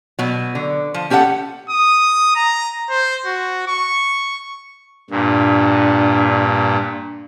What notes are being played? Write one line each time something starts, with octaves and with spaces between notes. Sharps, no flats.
B2 F#3
D3
F3
C#4 G4 A4 C5 F#5
D#6
A#5
C5
F#4
C#6
G2 A#2 D4